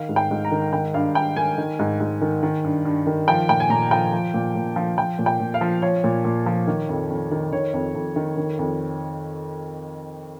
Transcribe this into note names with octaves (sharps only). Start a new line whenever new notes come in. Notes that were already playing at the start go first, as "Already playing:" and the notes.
Already playing: D#3 F5
G#2
G5
G#2
A#5
D#3
D#3 G5
G2 F5
G2 G5
D#3 G#5
D#3
G#2
G#2
D#3
D#3
G2
G2
D#3
F3 G5
A#2 G5
G#5
A#2 A#5
F3 G5
F3
A#2
A#2
F3
F3 G5
A#2
G5
A#2
F5
F3
F3 C#5
A#2
A#2
F3
D#3
F2
F2
D#3
D#3 C#5
F2
F2
D#3
D#3
F2